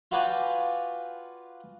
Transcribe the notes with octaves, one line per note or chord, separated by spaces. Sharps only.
F4 F#4 B4 D5 G5 G#5